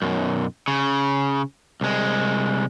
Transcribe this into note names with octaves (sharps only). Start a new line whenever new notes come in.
B1 F#2
C#3
C2 G#3